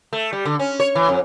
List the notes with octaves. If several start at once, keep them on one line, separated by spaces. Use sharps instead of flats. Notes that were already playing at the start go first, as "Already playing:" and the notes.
A3
G3
D3
C#4
C#5
E3
F2